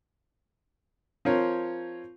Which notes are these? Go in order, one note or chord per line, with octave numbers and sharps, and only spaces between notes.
F3 C4 A#4 C#5